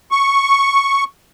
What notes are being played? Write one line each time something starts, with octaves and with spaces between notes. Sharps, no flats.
C#6